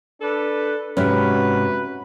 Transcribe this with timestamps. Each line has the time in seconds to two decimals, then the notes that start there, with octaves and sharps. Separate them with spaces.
0.21 D4 A4 B4
0.97 G#2 C3 C#4 F#4 B4